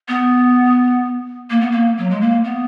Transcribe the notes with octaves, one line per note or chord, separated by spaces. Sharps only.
B3
A#3
B3
A#3
F#3
G#3
A#3
B3